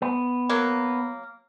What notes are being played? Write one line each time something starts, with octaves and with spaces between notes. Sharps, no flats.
B3
F#3 A#3